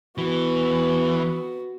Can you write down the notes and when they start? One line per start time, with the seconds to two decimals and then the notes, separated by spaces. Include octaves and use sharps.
0.18 E3 B3 F#4